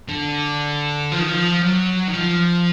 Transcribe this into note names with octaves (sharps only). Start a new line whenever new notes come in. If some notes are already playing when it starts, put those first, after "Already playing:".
D3
F3
D#3
F3
F#3
D#3
F3